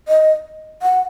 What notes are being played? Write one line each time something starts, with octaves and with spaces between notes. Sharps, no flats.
D#5
F#5